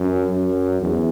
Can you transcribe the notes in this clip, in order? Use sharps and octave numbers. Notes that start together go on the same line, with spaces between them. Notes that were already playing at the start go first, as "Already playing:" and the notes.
Already playing: F#2
F#2
E2